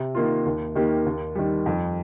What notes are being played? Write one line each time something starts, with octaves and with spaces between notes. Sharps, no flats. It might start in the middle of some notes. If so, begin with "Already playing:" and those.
Already playing: C3
D#3 A#3 F4
D#2
D#3 A#3 G4
D#2
D#3 G3
F2